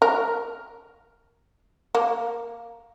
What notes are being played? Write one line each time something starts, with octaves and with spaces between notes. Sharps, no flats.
A#4
A#3